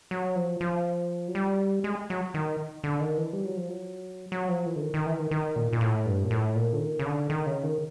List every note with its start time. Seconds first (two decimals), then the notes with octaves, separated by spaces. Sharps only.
0.11 F#3
0.36 F3
0.61 F3
1.28 F#3
1.35 G3
1.84 G#3
2.10 F#3
2.34 D#3
2.84 D3
3.00 D#3
3.17 E3
3.33 G3
3.45 F#3
3.57 F3
3.69 F#3
4.32 F#3
4.49 F3
4.66 E3
4.76 D3
4.82 D#3
4.94 D#3
5.06 E3
5.19 D#3
5.31 D#3
5.56 A#2
5.73 A#2
5.81 A2
6.06 G2
6.24 A#2
6.31 A2
6.56 A#2
6.73 D3
6.80 D#3
6.99 C#3
7.05 D3
7.30 D#3
7.46 C#3
7.63 D#3